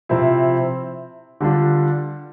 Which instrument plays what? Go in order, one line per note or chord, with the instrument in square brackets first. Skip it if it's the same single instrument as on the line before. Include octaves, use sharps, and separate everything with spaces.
[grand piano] C3 F3 C4 E4
D3 G3 D4 F4